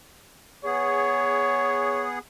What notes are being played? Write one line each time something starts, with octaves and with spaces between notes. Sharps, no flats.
B3 G#4 C#5